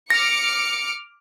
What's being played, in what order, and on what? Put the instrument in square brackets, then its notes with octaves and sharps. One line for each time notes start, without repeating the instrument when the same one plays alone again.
[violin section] D6 F6 C#7 [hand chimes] A#6